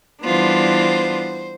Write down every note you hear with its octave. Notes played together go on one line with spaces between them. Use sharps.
E3 G3 B3 D4 F4 C5